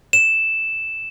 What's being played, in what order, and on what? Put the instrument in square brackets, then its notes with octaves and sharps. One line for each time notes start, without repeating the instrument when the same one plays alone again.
[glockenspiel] E7